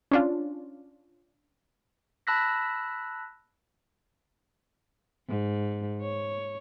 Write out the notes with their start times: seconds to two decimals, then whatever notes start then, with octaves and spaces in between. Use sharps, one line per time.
0.11 C#4 D4 F4
2.27 A5 B5 E6 F#6 A#6 B6
5.28 G#2
6.01 C#5